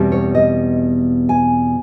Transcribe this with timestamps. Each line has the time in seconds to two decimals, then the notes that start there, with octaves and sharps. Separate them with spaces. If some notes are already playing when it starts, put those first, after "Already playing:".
Already playing: E2 B2 G3 C4
0.12 C#5
0.35 D#5
1.29 G#5